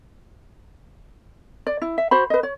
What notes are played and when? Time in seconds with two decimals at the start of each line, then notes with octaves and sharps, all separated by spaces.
1.67 D5
1.82 E4
1.98 E5
2.11 F#4 C5 B5
2.30 B4 D#5
2.43 C#5